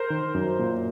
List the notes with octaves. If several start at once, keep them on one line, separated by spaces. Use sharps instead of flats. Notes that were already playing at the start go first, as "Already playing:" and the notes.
Already playing: A#4 C5
D#3
F#2
A#2